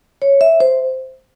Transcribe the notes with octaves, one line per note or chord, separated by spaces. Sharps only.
C#5
E5
C5